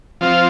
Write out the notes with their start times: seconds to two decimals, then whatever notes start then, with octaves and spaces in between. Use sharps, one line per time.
0.21 F3 C4 F4